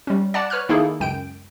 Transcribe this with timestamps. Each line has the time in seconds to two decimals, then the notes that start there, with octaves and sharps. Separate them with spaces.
0.07 G3 C#4
0.34 D5 F#5 A5
0.50 B4 C#5 F6 F#6
0.69 D#3 A#3 D#4 E4 G#4 A4
1.00 C#2 F#2 G5 D7